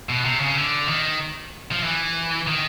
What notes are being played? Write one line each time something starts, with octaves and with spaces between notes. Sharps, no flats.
B2
C3
C#3
D3
D#3
F3
E3
D#3